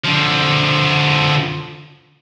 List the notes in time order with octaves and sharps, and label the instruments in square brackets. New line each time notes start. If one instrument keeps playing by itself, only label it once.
[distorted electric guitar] D3 F3